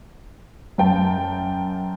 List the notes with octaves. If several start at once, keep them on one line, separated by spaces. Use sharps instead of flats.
F#2 G5 A5